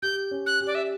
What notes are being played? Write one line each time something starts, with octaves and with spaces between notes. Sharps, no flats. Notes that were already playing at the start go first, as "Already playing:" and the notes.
G4 G6
C#4
F#6
G4
D5
E5